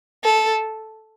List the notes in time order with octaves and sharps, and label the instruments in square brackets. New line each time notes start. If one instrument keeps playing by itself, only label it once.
[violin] A4